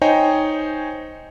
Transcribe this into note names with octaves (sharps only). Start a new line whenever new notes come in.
D#4 C5 C#5 D#5 G5 G#5